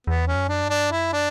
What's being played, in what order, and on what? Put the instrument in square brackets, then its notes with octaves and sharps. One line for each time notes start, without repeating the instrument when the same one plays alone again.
[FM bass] E2 [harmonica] B3
[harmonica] C#4
[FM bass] F#2
[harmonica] D4
[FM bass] G2
[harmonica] D4
[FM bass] F#2 [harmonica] E4
[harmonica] D4